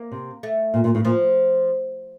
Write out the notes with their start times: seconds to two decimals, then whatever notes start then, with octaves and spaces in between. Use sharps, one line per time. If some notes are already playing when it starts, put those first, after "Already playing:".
Already playing: A#3
0.12 C3
0.43 A3
0.74 A#2
0.84 A#2
0.95 A2
1.05 A#2 F3